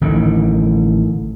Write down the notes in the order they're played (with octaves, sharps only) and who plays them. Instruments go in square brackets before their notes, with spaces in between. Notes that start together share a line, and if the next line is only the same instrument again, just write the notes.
[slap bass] A1 D3 D#3